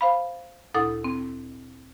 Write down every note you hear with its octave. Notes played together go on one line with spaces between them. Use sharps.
C5 F5 B5
D2 A#2 E4 A4 F#5 D#6
C4